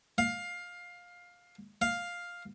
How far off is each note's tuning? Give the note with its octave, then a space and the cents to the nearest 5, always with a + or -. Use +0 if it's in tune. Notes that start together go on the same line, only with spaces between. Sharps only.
F5 +15
F5 +5